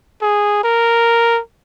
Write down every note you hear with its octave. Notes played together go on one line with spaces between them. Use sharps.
G#4
A#4